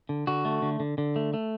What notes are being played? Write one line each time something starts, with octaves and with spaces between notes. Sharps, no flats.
D3
D3 F#4
A3
D3
D3
D3
A3
A3